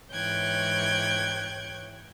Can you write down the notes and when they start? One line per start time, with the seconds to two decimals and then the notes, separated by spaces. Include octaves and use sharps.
0.12 G#2 E3 C#5 G5 F#6 G#6